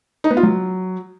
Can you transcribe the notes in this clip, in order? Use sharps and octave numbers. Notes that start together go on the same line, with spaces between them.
D#4
B3
F4
F#3